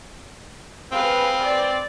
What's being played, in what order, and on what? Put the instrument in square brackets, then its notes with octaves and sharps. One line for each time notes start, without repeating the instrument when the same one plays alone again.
[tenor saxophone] C4 [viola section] G#4 B4 F5
[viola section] D5